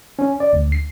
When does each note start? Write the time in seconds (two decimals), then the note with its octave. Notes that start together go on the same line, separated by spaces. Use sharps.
0.19 C#4
0.40 D5
0.53 D2
0.72 C7